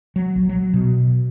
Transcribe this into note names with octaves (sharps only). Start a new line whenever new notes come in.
F#3
A#1
F#3
B2